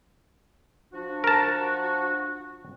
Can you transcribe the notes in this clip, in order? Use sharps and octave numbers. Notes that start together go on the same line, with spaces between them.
F3 D4 F#4
A#4 A5